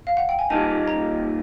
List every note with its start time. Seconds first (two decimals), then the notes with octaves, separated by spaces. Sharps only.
0.07 F5
0.17 F#5
0.29 G5
0.39 G#5
0.50 A#2 G3 A#3 D#4 A5
0.88 A#5